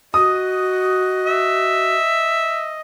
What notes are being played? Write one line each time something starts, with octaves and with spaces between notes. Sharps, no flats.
F#4 D#5 D#6
E5